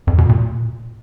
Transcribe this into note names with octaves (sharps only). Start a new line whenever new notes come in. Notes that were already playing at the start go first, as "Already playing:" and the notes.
F2
B2
A#2